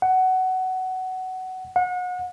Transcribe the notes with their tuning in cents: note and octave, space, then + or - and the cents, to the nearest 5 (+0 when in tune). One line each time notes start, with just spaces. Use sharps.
F#5 +15
F#5 -35